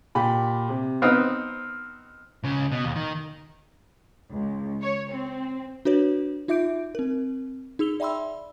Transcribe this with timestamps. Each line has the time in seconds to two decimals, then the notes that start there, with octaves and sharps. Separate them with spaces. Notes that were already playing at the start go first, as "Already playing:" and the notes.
0.15 A#2 G4 B5
0.69 C3
1.02 B3 C4 D#4 F6
2.43 C#2 C#3
2.72 B2
2.85 D#2
2.96 D#3
4.32 C#2
4.82 C#5
5.12 C4
5.85 D4 F#4 B4 C#5
6.48 D#4 F4 E5 D6 G6 D7
6.95 C4 A#4
7.79 D#4 G#4 E6 F7 G7
8.00 D5 E5 G5 B5 C6 E6